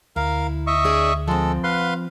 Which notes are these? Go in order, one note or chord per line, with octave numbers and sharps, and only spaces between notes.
D2 E4 A#4 F5
D#5 E5 C#6
D4 G#4 D5
F3 G#3 C4 A4
B4 F5 F#5 C6